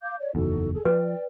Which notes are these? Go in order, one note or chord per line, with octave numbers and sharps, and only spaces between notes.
F5 D6 G6
C#5 D5
F#1 E2 D#4 F#4 A4
G#4 A4
F3 B4 D5 G5